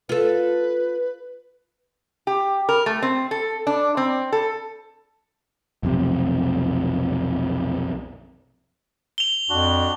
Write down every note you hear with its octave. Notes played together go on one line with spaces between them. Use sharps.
F4 A4 B4
G4
A#4
A3
C4
A4
D4
C4
A4
B1 F2 C3
F7 G7
F2 D4 F#4